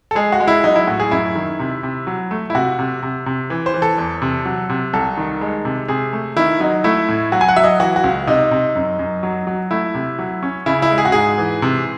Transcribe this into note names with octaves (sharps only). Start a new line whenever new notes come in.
A4
G#3 G#4
F#4
G#3
E4
F#3 D#4
E4
A2 F#4
G#4
F#2 E4
D#3
C3
C3
F#3
A3
E4
C3 F#4
C3
C3
C3
E3
C5
E3
A4
E2
C3
F#3
C3
C2 A4
D#3
G#3
C3
C3 G#4
A3
D#3 E4
F#3 D#4
A3 E4
A2
F#3 F#4
G#5
F#5
F#3 E5
D#5
E3 F#4
F#4
C#2
C3 D#4
C3
F#2
F#2
F#3
F#3
A3 E4
C3
F#3
C#4
C#3 E4
E4
G#3
G#4
F#4
G#2 G#4
E3
C3